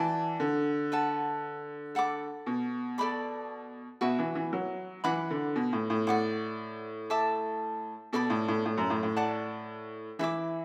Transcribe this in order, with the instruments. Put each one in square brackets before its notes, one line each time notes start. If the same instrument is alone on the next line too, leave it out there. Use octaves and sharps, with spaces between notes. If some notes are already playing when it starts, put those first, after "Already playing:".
Already playing: [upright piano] E3 [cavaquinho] F#4 D5 A5
[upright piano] D3
[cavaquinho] B4 F#5 A5
A4 F#5 B5 D6
[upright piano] B2
[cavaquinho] A4 D5 B5 D6
[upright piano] B2 [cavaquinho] F#4 B4 E5
[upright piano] E3
E3
F#3
[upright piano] E3 [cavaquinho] B4 F#5 B5 D6
[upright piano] D3
B2
A2
A2
[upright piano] A2 [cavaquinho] D5 F#5 D6
[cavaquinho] A4 E5 A5 D6
[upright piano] B2 [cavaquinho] A4 D5 B5 D6
[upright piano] A2
A2
A2
F#2
A2
A2
[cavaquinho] D5 F#5 A5 D6
[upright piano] E3 [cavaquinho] E4 A4 E5 D6